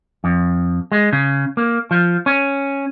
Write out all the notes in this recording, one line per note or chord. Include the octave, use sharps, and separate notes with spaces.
F2
G#3
C#3
A#3
F3
C#4